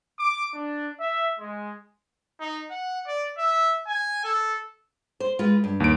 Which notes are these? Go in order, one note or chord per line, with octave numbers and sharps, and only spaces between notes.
D6
D4
E5
G#3
D#4
F#5
D5
E5
G#5
A4
C5
G#3 F4 B4
G2
D#2 D7